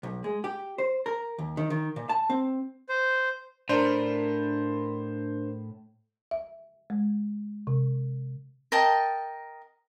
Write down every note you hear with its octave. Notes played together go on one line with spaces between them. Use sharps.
B1
G#3
G4
C5
A#4
D#2
D#3
D#3
A#2
A5
C4
C5
A2 D4 A#4 C5
E5
G#3
C3
A#4 D#5 G5 A5